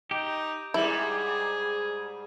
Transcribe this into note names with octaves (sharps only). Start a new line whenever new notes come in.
D#4 G4
G#2 G3 E4 G#4